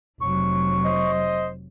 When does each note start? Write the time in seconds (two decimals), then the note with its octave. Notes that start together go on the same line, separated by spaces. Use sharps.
0.21 F1 F#3 C#6
0.84 C5 D#5